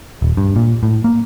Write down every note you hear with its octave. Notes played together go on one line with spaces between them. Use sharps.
D#1
G2
A#2
A2
A#3